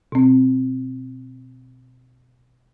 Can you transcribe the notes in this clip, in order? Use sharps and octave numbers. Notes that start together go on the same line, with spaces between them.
B2 C4